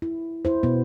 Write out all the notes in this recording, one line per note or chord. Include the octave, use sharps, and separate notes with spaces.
E4
E4 C5
B2 B3